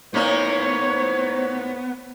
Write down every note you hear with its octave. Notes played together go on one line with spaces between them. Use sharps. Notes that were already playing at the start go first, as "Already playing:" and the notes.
A2 A#3 B3 D#4 C5 C#5